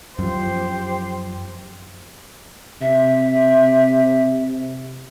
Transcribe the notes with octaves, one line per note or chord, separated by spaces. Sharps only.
F#2 F3 G4 C5
C3 E5